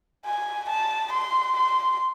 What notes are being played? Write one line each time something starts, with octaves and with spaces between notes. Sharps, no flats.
G#5
A5
C6
C6